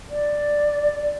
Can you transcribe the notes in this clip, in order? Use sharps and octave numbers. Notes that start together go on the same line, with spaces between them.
D5